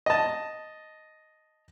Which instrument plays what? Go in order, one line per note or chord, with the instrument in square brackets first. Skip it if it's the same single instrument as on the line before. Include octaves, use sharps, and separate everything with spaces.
[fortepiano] D#5 A5